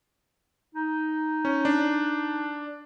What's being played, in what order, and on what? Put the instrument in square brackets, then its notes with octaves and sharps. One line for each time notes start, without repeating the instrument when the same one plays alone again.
[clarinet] D#4
[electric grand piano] C#4
D4